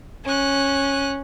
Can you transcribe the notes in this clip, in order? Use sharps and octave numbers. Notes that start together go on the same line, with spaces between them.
C#4 F#6